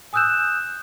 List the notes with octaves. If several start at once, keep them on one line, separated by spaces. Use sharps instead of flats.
G#5 D#6 E6 F#6 G6 E7